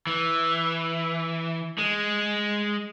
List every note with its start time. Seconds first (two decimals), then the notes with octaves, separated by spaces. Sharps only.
0.07 E3
1.78 G#3